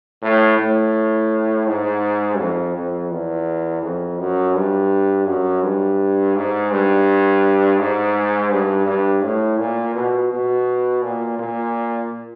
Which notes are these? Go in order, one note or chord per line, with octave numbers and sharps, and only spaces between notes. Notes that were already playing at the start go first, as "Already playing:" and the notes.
A2
A2
G#2
F2
F2
E2
F2
F#2
G2
F#2
G2
G#2
G2
G#2
G2
G2
A2
A#2
B2
B2
A#2
A#2